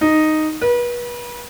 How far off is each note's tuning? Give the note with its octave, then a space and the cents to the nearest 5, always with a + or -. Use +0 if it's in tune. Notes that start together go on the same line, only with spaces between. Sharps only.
D#4 -5
B4 -35